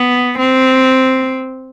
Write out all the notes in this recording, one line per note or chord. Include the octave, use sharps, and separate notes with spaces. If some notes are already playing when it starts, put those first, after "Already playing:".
Already playing: B3
C4